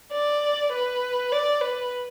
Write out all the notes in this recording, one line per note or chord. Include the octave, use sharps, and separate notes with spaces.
D5
B4
D5
B4